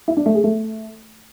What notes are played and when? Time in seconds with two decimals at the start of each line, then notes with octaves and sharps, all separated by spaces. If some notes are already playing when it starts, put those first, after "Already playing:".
0.08 E4
0.17 D4
0.26 A3
0.35 G#4
0.44 A3